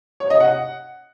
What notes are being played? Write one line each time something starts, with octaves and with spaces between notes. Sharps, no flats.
C#5
D#5
F#5